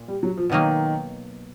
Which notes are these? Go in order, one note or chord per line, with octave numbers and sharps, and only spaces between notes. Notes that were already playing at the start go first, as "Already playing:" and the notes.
Already playing: A#2
G3
F#3
F3
B2 D#3 F#3 A#3 D#4